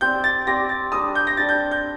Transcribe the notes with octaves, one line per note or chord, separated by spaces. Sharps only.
C4 G4 D5 G6
A6
C4 G4 D5 A#6
A6
G3 D4 A4 D#6
G6
A#6
G3 D4 A4 A6
G6
G6